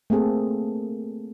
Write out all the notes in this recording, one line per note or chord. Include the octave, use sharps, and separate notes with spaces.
A3 A#3 C4 G#4 A4